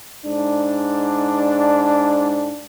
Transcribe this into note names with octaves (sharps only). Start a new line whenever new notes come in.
G#2 D4